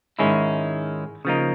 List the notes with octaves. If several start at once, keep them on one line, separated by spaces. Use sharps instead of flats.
G#2 D#3 G#3 C#4 E4
C#3 F3 A#3 D#4